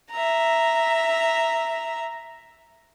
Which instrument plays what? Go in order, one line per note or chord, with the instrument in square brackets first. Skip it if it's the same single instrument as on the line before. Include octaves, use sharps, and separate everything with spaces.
[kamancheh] E5 A#5